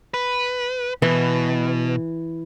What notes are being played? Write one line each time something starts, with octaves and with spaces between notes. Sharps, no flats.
B4
B2 E3